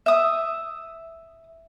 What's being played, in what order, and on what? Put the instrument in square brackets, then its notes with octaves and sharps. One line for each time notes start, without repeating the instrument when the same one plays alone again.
[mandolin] E5 D#6